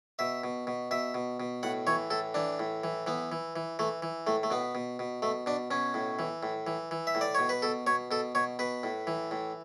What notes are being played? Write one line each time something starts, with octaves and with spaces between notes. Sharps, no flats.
B2 E5
B2
B2
B2 E5
B2
B2
A2 F#5
E3 C#5
A2 A4
E3 D4
A2
E3
E3 B3
E3
E3
E3 A3
E3
A2 A3
A3
B2 B3
B2
B2
B2 A3
B2 D4
B2 C#4
A2
E3
A2
E3
E3
E5
A2
D5
B2 C#5
B4
B2 A4
B2 C#5
B2 A4
B2 C#5
B2 B4
A2
E3
A2